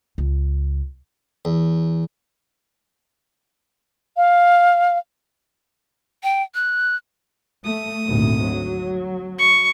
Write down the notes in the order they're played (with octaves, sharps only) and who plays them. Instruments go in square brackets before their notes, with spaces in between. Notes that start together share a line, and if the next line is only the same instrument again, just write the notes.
[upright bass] C#2
[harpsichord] E2
[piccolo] F5
[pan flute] G5
F#6
[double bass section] A3 [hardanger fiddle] D#6
[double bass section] G#1 D2 A#2
F#3
[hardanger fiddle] C#6